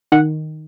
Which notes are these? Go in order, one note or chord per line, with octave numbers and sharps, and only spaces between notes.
D#3 F#5